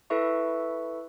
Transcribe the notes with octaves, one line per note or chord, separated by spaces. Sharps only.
E4 A4 B4 E5 C#6